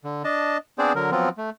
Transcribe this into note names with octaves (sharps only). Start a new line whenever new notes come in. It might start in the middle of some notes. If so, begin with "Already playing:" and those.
D3
D4 D#5 A5
B3 C4 D4 G#4 C5 D5
D3 F#3 A#4
F3 F#3 B3 C4 F4
A3